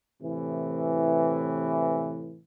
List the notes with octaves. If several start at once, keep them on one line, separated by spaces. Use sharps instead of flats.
A2 C3 E3